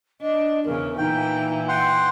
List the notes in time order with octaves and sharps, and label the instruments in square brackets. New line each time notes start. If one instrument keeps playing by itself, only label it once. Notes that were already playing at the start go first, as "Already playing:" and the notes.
[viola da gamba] D4 [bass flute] D#5
[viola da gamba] E2 C#3 [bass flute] A#4
[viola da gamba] A#2 E3 [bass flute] D#4 [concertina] G5
[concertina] F#5 G5 C6